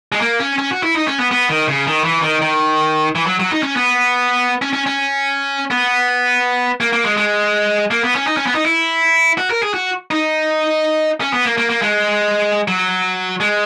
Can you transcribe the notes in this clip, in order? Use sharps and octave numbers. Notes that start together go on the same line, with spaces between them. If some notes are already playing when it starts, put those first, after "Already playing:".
G#3
A#3
C#4
C#4
F#4
E4
D#4
C#4
B3
B3
D#3
C#3
D#3
E3
D#3
D#3
E3
F#3
F#3
D#4
C#4
B3
C#4
C#4
C#4
B3
A#3
A#3
G#3
G#3
A#3
B3
C#4
D#4
C#4
B3
D#4
E4
F#4
A#4
G#4
F#4
D#4
C#4
B3
A#3
A#3
A#3
G#3
F#3
G#3